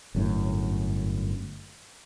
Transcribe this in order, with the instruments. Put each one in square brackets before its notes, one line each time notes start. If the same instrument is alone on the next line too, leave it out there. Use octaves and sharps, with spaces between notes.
[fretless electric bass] G1 F#2 A2